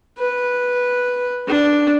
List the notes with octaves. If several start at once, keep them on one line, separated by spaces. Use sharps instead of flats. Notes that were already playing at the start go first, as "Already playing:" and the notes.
B4
D4